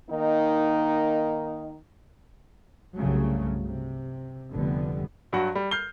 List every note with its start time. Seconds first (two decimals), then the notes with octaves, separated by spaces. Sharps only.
0.10 D#3 A#3 D#4
2.96 C2 G2 C#3 F#3 A3
3.66 C3
4.52 F1 D3 G3 B3
5.33 G2 F#3 F#4 F#5
5.55 G3
5.71 F6 G6 C7 G7